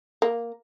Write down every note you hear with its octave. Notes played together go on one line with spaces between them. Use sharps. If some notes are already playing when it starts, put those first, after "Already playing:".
A#3